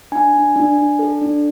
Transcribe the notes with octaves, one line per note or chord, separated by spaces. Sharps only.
D4 G#5
D4
D4
D4
A4
D4